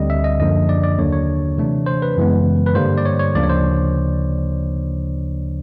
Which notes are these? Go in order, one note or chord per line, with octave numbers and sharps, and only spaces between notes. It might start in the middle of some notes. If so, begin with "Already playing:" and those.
Already playing: D2 D3 G3 C4 D#5
E5
D#5
F#2 D3 F3 A#3 D4 D#5
D5
D5
D#2 D3 F#3 A#3 D4 C#5
C#5
C3 E3 A3 D4
C5
B4
F#2 C#3 E3 G#3 B3
B4
G2 D3 G3 A#3 C5
D5
C#5
C#5
D2 C#3 F3 A#3 D4 D5
C#5
C5